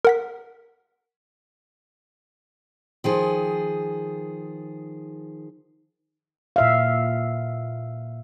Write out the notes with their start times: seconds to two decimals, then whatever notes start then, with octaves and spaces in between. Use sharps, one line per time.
0.05 A#4 F#5 B6
3.04 D#3 F3 G#4
6.56 A#2 E5 F5